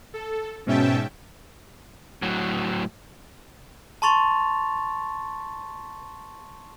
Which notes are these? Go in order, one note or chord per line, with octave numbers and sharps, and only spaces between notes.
A4
G#2 B2 C#4 E5 G5 A5
A2 F#3
A5 A#5 C6 C#6 A6 F7